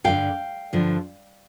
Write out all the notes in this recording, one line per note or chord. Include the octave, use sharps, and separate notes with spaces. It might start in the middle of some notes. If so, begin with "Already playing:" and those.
G2 D3 F3 F5 G5
G2 D3 F3